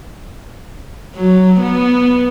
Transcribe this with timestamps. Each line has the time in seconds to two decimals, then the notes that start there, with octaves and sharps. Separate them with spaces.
1.16 F#3
1.61 B3